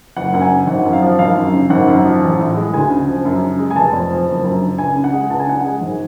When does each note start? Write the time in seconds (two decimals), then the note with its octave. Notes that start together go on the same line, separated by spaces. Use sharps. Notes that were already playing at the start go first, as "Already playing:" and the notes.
0.16 F#1 F#5
0.33 F#2 F#5
0.41 G#5
0.50 C#3
0.67 G#1 F#5
0.85 F#2
0.93 F5
1.02 F3
1.19 G#1 F5
1.36 F#2
1.53 C#3
1.70 G#1 F#5
1.87 F#2
2.04 F3
2.22 A1
2.39 A2
2.56 G#3
2.73 D2 G#5
2.90 C#3
3.07 F3
3.25 F#2
3.42 C#3
3.59 G#3
3.71 G#5
3.75 F1 A5
3.93 F2
4.10 F3
4.28 F#1
4.44 F#2
4.61 D3
4.78 C#2 G#5
4.96 C#3
5.04 F#5
5.13 G#3
5.30 C#2 A5
5.40 G#5
5.47 C#3 F#5
5.60 G#3 G#5
5.81 G#1